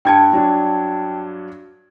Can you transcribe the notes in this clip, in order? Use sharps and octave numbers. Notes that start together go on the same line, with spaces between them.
G2 G5 A5 G#6 C#7
G2 F#3 D4